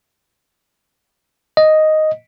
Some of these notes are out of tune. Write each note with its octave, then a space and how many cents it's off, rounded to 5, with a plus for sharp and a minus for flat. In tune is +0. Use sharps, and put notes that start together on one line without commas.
D#5 +0